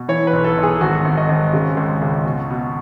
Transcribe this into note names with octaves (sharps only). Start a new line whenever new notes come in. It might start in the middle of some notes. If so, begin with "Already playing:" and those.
Already playing: B2
E3 C#5
B4
B1
A4
B1
G#4
G#1 F#4
G#1
D#5
G#1
C#3
C#2
C#2
B2
B2